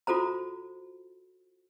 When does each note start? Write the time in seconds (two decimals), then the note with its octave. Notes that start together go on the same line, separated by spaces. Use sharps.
0.07 F4 F#4 A4 C5 A#5